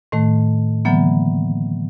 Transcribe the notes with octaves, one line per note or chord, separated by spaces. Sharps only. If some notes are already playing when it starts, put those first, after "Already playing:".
A2 D#3 A3
D3 E3 F#3 A#3 B3